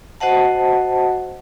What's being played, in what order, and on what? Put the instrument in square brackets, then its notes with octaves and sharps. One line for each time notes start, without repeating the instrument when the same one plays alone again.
[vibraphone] F#4 C5 D#5 F#5 A5